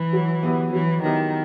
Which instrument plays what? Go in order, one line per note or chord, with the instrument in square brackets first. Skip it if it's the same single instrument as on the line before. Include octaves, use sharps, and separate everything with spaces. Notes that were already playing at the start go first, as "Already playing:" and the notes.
Already playing: [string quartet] E3
[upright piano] F#3
B3 E4 G4 B4
[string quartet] E3 [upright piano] F#3
[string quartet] D#3 [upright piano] B3 E4 G4 A#4